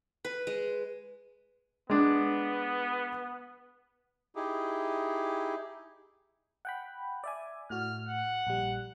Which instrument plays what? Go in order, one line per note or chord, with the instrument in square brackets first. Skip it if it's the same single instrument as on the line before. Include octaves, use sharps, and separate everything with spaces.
[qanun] B4
G#3
[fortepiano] G#3 D4 [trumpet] B3
[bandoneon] D#4 E4 G4 G#4
[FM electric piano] F#5 G5 B5
D5 E5 G#5
[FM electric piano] A2 F#4 [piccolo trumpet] F6
[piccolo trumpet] F#5
[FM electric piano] A#1 G3